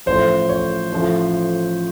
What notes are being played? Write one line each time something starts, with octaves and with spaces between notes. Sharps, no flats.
A1 A2 F3 C5
C#5
A1 A2 F3